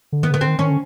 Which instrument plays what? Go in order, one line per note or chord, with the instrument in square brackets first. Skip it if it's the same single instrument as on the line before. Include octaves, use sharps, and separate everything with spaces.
[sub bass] D3
[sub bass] D#3 [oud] B3
[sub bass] C#3
[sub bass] D3 [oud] B3
[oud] C4
[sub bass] D#3
[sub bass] D#3 [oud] C#4
[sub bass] D3